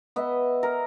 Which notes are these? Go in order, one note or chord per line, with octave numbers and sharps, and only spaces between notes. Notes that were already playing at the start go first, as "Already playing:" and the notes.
B3 D#5 E5
A#4